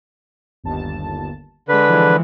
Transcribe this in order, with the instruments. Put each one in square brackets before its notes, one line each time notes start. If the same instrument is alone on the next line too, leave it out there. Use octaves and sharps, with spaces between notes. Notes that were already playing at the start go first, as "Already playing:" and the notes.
[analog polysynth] G1 D#2 A5
[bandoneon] D3 B4 [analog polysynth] G#3 B6
[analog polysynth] E3 F3 G#3